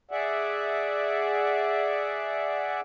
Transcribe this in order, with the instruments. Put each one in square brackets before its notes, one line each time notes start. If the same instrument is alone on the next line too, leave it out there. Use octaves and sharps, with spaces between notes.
[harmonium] G#4 D5 E5 F#5